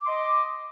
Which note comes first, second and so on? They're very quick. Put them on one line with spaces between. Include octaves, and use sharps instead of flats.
D6 C6 D#5